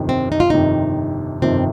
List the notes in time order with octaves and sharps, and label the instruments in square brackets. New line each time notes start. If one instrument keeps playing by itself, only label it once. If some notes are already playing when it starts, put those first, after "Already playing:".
Already playing: [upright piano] G1 F2 C3 D#3
[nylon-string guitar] C4
D#4
F4
[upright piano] G1 F2 C3 D#3 [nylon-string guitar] D#4
[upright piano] G1 F2 C3 D#3 [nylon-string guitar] C4